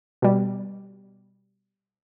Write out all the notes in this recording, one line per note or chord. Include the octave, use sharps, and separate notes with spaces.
B2 G3